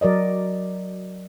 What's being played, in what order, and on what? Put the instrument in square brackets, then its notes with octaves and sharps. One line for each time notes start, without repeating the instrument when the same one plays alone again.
[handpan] F#3 A#4 D5 D#5